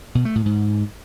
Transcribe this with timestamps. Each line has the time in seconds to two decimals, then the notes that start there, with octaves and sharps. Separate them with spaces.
0.15 B2
0.25 A3
0.35 A2
0.46 G#2